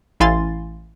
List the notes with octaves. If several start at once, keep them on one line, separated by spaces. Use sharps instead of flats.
A1 E4 F5 G#5 C6 A6